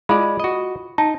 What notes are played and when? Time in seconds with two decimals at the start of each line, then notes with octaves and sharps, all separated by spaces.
0.09 G#3 F4 D5 F5 B5
0.40 F#4 D#5
0.98 D#4 A5